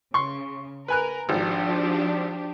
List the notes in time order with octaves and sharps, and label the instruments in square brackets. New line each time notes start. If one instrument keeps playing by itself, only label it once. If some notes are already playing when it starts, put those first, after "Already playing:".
[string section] C#3 [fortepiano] C6 C#6
[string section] A#4 [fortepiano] B4 G#5 F#6
[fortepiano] G#1 [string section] F3 D4 G4